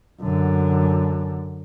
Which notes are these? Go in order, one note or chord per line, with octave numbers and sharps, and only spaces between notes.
F#2 D3